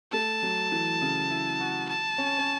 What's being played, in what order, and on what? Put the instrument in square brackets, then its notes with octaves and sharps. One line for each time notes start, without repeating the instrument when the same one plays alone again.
[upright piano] A3 [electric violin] A5
[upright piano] F#3
E3
C#3
E4
F#4
[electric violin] A5
[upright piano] C#4
C#4